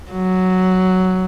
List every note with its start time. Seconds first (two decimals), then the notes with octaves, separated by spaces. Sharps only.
0.11 F#3